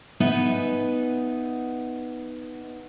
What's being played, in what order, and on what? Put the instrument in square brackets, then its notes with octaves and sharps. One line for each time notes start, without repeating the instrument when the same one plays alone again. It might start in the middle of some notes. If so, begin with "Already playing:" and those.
[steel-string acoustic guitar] B3 D#4 B4 E5 G#5